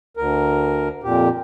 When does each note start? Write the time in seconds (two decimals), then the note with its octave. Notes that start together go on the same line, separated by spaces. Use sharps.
0.17 D2 A#4
1.03 F2 A#2 G4